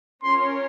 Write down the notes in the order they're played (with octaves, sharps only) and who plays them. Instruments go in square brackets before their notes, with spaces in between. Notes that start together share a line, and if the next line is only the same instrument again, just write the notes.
[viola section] C#4 F4 A#4 C#5 [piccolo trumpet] C6